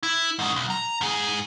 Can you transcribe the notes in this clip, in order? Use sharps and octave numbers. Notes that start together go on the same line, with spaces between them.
E4
G#2 C#3
B1
A#5
G#2 G#4